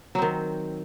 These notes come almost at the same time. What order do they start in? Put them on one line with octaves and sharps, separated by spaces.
F#3 C4 D#3